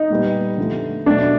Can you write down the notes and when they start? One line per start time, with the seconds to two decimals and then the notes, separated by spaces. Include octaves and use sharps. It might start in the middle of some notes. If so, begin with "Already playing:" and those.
Already playing: D#4
0.10 A#2 G3 B3
0.58 D3 F3 A3
1.06 B2 F#3 A3 D4